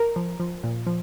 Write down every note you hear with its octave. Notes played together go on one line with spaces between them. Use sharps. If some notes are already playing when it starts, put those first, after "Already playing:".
Already playing: A#4
F3
F3
A#2
F3